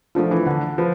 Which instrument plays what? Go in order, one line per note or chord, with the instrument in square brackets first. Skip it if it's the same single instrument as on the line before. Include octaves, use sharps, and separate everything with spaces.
[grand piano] F3 [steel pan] A3 D4 F4
[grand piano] E3
D3
[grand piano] F3 [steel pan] B4